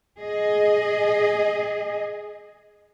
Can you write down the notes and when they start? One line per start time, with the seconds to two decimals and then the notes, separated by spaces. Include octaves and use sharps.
0.19 G#4 D#5